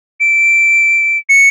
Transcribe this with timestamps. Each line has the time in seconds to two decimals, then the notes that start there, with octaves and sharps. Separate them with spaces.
0.20 D7
1.29 C#7